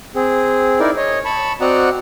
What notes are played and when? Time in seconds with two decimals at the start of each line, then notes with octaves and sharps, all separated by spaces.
0.15 C4 G#4
0.80 D#4 E4 A#4 D5
0.97 C#5 D#5
1.25 A5 B5 C#6
1.61 C4 F#4 D5 D#5 F#5 A#5